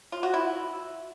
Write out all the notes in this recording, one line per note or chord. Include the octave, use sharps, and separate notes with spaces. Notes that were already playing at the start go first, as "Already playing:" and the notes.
F4
F#4
E4